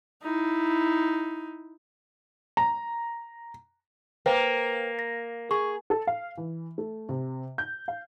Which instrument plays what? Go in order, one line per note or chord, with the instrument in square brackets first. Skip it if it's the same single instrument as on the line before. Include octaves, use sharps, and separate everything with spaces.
[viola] D#4 E4
[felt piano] A#5
[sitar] A#3 [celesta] B4 C5 G5
[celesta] A#6
[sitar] G#4 [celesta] C#6
[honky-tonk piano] A4
F5
E3
A3
C3
G6
F5